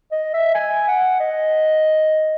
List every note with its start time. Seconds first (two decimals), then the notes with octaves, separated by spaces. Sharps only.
0.12 D#5
0.34 E5
0.55 G#5
0.88 F#5
1.20 D#5